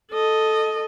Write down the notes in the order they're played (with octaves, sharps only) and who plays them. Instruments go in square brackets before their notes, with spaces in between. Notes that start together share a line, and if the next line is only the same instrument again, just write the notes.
[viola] A4 D#5